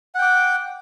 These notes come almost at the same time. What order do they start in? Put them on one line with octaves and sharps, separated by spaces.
F#5 G5 D6